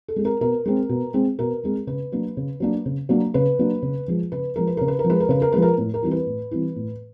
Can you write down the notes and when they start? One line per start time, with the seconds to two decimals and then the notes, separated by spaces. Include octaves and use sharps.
0.08 A4
0.16 G#3 C4
0.25 A#4
0.41 B2 A#4
0.66 G#3 C4
0.89 B2
1.14 G#3 C4
1.39 B2 A#4
1.64 G#3 C4
1.87 C#3 B4
2.12 F#3 A#3 D4
2.37 C#3
2.60 F#3 A#3 D4
2.86 C#3
3.09 F#3 A#3 D4
3.34 C#3 B4
3.59 F#3 A#3 D4
3.82 C#3
4.08 F3 G#3
4.32 C#3 B4
4.56 F3 G#3 A#4
4.67 B4
4.77 C#3 A#4
4.88 B4
4.99 A#4
5.04 F3
5.09 G#3 B4
5.20 A#4
5.29 C#3 B4
5.42 A#4
5.52 F3 G#3 B4
5.62 A#4
5.78 A2
5.94 A#4
6.02 E3 G3 C4 E4
6.11 B4
6.26 A2
6.51 E3 G3 C4 E4
6.76 A2